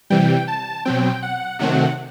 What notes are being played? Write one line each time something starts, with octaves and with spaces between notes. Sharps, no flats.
C3 E3 G3 G5
A5
B2 F#3 C4 G5
F#5
C3 D#3 F#3 A3 C4 F#5